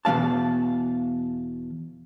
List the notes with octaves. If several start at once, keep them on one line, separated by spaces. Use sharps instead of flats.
E2 B2 G#3 F5 A5